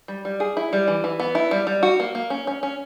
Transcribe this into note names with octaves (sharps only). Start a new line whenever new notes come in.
G3
G3
G#4
E4
G3
E3
E3
B3
E4
G3
G3
F#4
A#3
A#3
C#4
C#4
C#4